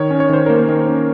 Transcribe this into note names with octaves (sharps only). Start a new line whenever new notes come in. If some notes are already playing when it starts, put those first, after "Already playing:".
Already playing: D#3 C#5
C#4
C#5
D#3 C5
A#3 A#4
C5
D#3
C#4